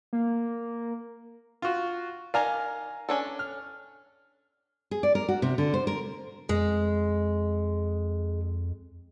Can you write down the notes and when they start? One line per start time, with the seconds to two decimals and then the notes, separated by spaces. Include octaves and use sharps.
0.13 A#3
1.62 F4 F#4
2.34 D#3 A#4 D5 F5 G#5 A#5
3.09 C#4 D4 A4
3.39 F6
4.91 G#4
5.03 D5
5.15 A#4
5.29 F#4
5.42 C3
5.58 D3
5.74 C5
5.87 A#4
6.49 F2 G#3